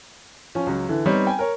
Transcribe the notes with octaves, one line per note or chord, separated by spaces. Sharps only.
F3 C#4
C#2 F#3
D3 E3
G3 B3 C4 D#4 C#5
G5 G#5
A#4 C#5